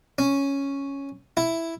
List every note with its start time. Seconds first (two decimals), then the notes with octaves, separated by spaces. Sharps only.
0.18 C#4
1.37 E4